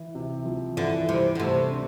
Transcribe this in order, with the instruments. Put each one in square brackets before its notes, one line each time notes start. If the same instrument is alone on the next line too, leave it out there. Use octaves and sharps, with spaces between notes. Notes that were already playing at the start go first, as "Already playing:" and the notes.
Already playing: [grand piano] E3
C3
F3
[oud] D3 [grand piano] E3
[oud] C3 [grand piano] G3
[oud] D3
[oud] C3 [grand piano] A3
[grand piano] D4